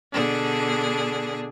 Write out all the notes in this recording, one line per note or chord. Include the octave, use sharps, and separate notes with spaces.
B2 D3 D4 G#4